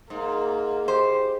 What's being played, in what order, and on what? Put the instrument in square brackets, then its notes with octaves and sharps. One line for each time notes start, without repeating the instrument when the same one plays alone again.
[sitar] G#2 [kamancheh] A#3
[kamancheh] G4 [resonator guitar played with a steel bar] C5